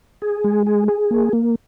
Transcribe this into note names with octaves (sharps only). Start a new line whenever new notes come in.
G#4
G#3
G#4
G#4
A#3
A#3